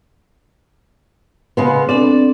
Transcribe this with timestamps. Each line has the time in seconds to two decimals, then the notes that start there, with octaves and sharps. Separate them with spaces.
1.57 C#3 G#3 B3
1.89 C4 D4 A4 D5